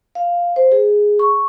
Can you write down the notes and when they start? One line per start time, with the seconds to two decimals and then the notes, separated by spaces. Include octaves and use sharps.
0.15 F5
0.56 C5
0.72 G#4
1.19 C#6